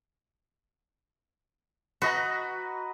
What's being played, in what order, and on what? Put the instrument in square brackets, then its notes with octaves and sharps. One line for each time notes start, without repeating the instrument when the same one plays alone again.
[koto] F#4 [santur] B4 D#5 A#5